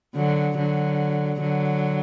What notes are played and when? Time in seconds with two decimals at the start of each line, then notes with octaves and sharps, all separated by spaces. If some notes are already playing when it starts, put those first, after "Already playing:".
0.16 D3 F#3
0.58 D3 F#3
1.41 D3 F#3